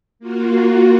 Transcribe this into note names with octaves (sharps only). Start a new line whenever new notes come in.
A#3 F4 F#4